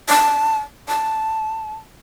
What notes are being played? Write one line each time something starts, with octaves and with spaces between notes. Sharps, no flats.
A5
A5